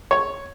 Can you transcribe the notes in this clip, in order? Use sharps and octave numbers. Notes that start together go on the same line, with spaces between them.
C#5